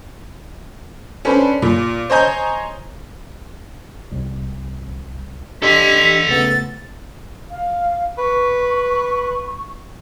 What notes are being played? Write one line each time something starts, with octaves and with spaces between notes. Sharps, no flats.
C#4 D4 A4 B4 C5
A#2
C5 C#5 D#5 G#5 A#5 G6
C2
D4 G4 A4 D#5 C6 B6
C#3 A3 B3 A6
F5
B4 C#6